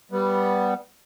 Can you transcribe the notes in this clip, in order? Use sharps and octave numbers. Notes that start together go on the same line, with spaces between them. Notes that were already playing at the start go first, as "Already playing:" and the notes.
G3 B3